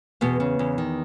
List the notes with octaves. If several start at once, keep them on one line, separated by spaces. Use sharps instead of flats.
E2 B2 B3
C#3
E2
D#3